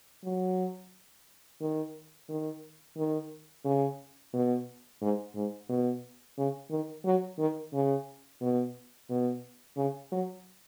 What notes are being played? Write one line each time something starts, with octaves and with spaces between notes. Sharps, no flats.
F#3
D#3
D#3
D#3
C#3
B2
G#2
G#2
B2
C#3
D#3
F#3
D#3
C#3
B2
B2
C#3
F#3